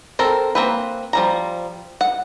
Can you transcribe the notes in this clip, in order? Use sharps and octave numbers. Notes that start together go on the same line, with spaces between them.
C4 A4 A#4
A#3 C4 B4
F3 G3 A#5
F#5